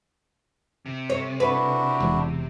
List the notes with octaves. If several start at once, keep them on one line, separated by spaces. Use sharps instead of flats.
C3
C#5
D4 E4 F#4 B4
E1 E2